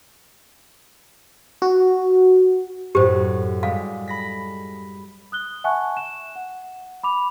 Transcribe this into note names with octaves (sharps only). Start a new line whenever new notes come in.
F#4
F#2 A2 G4 C5
G3 G#3 F5
B5 A#6 B6
D#6 F#6 G7
E5 F#5 G#5 A5 C#6 F#6
E7
F#5
B5 D6 F7